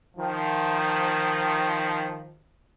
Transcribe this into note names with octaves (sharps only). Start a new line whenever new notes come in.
D#3 F3